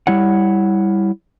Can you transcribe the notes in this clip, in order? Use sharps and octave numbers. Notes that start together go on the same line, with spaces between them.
G3 E4 C#5 F#5